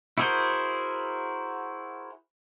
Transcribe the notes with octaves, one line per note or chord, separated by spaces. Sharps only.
E4 F#4 G#4 A#4 C5